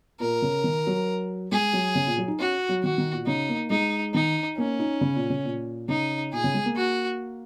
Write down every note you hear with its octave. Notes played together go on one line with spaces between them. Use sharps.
A#2 A#4
C#3
D#3
F#3
G#3 G#4
F#3
C#3
A#2
F#3
D#4
C#4 F#4
F#3
D#3 F#4
D#3
A#2
C#3 D#4
A#3
G#3 D#4
D#3 D#4
A#3 C#4
D#4
C#3
A#2
C#3
A#2
C#3 D#4
A#2 G#4
C#3
G#3
A#3
F#4